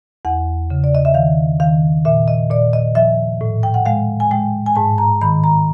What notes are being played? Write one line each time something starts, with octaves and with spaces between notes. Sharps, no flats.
E2 F#5
C#3
D5
D#5
E5
D#3 F5
D#3 F5
A#2 E5
D#5
A#2 D5
D#5
F3 E5
A2
G5
F#5
G#3 F5
G#5
G#3 G5
G#5
G#2 A5
A#5
D#3 B5
A#5